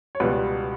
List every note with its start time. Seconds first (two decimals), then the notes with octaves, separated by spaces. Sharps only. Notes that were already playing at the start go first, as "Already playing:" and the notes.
0.15 C#5
0.20 C#2 B2 G3 B4